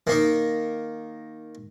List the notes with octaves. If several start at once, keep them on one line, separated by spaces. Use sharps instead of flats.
D#3 A#3 D#4